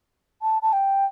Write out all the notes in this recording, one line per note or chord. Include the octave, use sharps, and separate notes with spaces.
A5
A5
G5